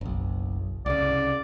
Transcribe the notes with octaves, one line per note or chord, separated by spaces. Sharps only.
F#1 B1
C2 C#3 D5